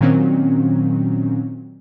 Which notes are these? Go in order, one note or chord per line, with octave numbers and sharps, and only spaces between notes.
A#2 D#3 F#3 C4 C#4